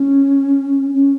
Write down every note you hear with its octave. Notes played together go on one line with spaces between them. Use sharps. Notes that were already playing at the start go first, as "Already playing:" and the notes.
Already playing: C#4
C#4